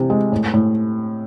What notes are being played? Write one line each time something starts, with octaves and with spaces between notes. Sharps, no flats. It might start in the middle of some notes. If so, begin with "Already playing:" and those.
Already playing: C3 E3
G#3
A2
A2